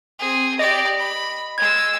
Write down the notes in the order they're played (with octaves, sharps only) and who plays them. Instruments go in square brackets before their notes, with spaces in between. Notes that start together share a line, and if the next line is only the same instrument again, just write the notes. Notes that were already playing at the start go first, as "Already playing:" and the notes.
[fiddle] C4 G#4
[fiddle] G4 D5 [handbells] D#5
[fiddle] B5
[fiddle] G#3 E6 [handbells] G#6